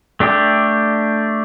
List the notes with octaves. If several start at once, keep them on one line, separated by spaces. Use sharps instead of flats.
A3 D4 G4